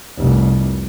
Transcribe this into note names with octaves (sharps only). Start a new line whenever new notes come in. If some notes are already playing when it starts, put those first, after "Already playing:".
F1 C2